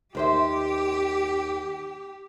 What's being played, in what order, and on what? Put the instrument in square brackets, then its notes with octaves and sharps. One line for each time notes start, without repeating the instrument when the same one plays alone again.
[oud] D#2 C5 E5 [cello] G4